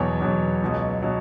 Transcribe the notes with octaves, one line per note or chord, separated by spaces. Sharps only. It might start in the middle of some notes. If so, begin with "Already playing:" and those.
Already playing: E2 B2 F#3 C#5
E2 B2 F#3
C#2 B2 F#3
B2 F#3